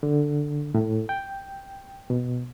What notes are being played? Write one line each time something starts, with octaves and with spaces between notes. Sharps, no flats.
D3
A2
G5
B2